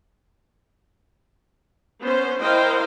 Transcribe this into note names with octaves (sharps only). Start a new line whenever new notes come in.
B3 C#4 C5
E4 A#4 C5 D#5 F5 G5